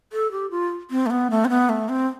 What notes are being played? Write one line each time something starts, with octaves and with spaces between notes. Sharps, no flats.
A4
G4
F4
C4
A3
B3
A3
C4
B3
A3
C4